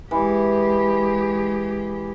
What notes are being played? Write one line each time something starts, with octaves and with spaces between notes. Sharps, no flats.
E3 G#3 G4